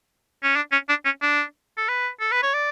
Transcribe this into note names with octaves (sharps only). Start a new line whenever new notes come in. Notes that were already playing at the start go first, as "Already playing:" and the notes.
C#4
D4
C#4
D4
C#4
D4
A4
B4
A4
B4
C#5
D5